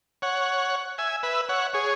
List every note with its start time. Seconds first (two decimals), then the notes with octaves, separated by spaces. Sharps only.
0.22 C#5 F#5
0.98 E5 G#5
1.23 B4 E5
1.49 C#5 F#5
1.74 G#4 C#5